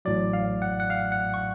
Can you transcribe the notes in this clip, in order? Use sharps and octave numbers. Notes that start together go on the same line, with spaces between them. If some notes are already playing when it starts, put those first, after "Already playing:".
A1 A2 F#3 D5
F5
F#5
F#5
F5
F#5
C#6